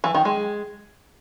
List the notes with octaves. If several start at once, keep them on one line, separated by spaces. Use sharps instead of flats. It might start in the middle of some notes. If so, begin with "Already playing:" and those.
E3
D#3
G#3